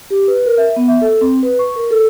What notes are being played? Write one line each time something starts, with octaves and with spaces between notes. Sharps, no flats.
G4
B4
A#4
E5
B3
E5
A4
C4
B4
C#6
A#4
A4